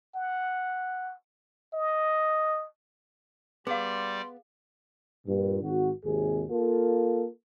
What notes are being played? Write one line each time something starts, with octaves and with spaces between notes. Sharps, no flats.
F#5
D#5
G3 B3 G#4 D5 F5 C6
G2 A#2
G#1 F#4
G#1 D#2 C3 G#4
A#3 F4 A4